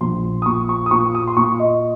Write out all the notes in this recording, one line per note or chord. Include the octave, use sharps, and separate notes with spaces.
A#1 C6
D#6
A#2 C#6
C#6
D#6
A#2 C#6
D#6
C6
A#2 C#6
D#5